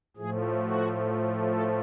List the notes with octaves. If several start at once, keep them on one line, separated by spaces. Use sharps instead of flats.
A2 F3 A3 G#4
F#4
A4